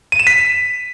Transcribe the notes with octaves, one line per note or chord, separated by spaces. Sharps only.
D#7
E7
B6